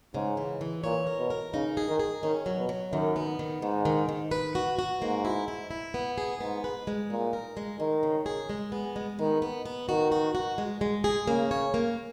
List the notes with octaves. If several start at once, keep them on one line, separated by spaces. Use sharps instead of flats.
G#2 C#3
E3
E3
A#2 C#5
A#4
B2
A#4
C#3 D#4
G#4
D#3
G#4
D#3 C#4
F#3
B2
F#3
F#2 D#3
B3
D#3
G#2 D#3
D#3
D#3
B4
F#4
F#4
G#2 A#3
E4
E4
E4
B3
G#4
G#2 B3
B4
G#3
A#2 D#4
A#4
G#3
D#3 G#3
C#3
G#4
G#3
B3
G#3
D#3 B3
B3
B3
D#3 F#4
F#4
F#4
G#3
G#3
G#4
C#3 A#3
C#5
A#3